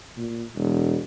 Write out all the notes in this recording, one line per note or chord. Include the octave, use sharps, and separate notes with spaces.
A#2
E1